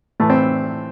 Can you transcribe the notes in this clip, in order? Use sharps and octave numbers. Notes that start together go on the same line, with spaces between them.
A2 E3 A3
C4